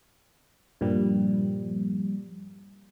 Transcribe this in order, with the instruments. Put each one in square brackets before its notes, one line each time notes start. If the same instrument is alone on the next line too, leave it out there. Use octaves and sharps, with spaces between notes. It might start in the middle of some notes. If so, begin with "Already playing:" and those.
[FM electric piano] G2 A#2 F3 G3